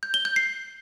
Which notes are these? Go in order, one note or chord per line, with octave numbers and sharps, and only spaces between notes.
G6
G7
G6
C7